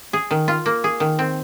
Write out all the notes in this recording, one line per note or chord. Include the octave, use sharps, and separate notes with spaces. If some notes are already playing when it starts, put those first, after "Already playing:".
G#4
D#3
F4
A#3
G#4
D#3
C4